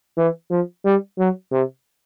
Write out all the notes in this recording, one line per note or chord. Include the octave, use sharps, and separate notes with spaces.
E3
F3
G3
F#3
C3